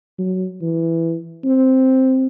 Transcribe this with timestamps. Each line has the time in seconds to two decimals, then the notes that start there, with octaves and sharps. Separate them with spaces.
0.19 F#3
0.61 E3
1.44 C4